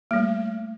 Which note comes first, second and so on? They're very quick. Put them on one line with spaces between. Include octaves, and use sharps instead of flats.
A#3 G3 A3